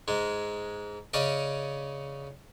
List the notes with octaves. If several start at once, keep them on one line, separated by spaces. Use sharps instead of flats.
G#2 G#3
C#3 C#4 D5 D#5